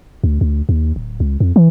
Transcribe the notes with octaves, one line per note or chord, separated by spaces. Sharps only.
D2
D2
D#2
D1
C#2
F2
E3